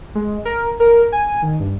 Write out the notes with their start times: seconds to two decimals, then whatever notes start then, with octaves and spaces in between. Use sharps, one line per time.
0.15 G#3
0.45 A#4
0.80 A#4
1.12 G#5
1.42 D#3
1.60 G2